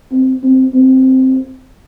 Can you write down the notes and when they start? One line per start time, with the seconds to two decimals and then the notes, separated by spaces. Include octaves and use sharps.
0.12 C4
0.43 C4
0.74 C4